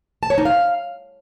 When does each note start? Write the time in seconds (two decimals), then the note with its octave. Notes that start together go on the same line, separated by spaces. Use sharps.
0.23 A5
0.30 C#5
0.38 D#4
0.45 F5